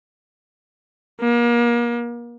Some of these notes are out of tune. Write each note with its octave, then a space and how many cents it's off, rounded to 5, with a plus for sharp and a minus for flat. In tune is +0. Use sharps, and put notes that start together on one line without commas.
A#3 +35